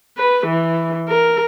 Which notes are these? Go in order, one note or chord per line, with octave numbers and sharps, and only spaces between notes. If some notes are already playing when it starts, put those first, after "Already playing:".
B4
E3
A#4